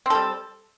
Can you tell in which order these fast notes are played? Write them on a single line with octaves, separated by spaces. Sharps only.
C4 A4 G3